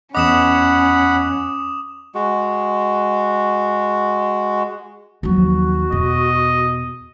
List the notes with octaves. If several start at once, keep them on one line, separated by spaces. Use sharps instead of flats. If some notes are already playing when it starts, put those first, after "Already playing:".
E2 C#4 D#5 F#5 B5 D6 D#6 E7
G#3 F#4
D#2 F3 F#3 F#4
E2 B2 D#5